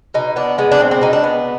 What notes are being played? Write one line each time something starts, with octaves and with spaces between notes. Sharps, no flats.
B2 D#4
B3 D4
G#3 B3
D4
B2 C4
C4
B2 D#4
D4
B3